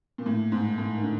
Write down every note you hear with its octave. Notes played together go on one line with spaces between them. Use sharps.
A#2
A2
G#2
A2
D#3
D3